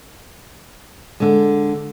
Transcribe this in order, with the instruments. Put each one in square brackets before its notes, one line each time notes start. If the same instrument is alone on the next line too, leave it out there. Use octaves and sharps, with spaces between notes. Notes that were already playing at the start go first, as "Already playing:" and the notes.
[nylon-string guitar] D3 G#3